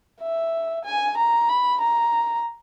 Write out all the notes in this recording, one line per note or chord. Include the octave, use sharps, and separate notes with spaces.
E5
G#5
A#5
B5
A#5